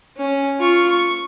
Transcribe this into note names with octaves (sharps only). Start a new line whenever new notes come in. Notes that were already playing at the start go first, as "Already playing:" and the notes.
C#4
F4 C#6
C#6